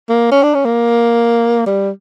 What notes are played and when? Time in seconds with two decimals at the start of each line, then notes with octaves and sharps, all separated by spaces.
0.09 A#3
0.31 C#4
0.43 D4
0.54 C#4
0.65 A#3
1.66 G3